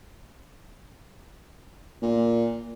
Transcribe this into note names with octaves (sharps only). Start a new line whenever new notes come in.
A#2